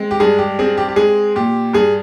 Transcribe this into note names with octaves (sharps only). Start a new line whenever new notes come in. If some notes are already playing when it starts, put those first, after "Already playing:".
Already playing: G#3 C4
G4
G2 G#4
G4
C4 G#4
G4
G4
G#3 G#4
A#2 G4
G2 G#4